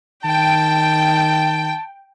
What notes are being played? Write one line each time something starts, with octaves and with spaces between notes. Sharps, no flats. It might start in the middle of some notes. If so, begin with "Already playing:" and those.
D#3 G5 A5